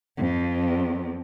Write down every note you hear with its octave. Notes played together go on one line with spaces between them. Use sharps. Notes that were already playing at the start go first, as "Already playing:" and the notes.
F2